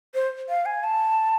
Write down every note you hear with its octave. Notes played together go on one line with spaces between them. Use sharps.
C5
F5
G#5
A5